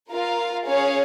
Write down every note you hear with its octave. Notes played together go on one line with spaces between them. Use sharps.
F4 A#4 F5
C#4 G#4 C#5 F5